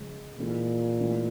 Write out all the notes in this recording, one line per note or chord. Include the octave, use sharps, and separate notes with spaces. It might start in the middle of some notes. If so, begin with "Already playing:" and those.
Already playing: C#3 F3 G#3
A#2 E3 G#3 C4 E4 A4
A2 E3 G#3 C4